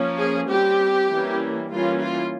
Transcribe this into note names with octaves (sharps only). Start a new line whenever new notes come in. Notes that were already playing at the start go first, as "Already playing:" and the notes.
Already playing: F3 A#3 C#4
G#4
G3 C4 G4
E3 G3 A#3 C#4
E3 G3 A#3 C#4 F4
F4